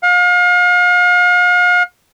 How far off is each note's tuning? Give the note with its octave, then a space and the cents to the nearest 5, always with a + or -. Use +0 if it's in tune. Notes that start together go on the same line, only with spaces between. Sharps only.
F5 +40